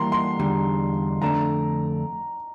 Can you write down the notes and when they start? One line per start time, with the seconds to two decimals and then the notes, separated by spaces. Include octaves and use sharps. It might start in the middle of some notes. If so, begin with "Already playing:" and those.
Already playing: E3 G3 A#3 E4 G4 A#5 C6
0.12 C6
0.39 E2 D3 G3
1.21 F2 D3 A3 D4 A#5